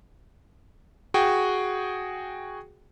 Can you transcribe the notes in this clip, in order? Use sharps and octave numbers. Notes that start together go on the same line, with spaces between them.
F#4 G#4 G5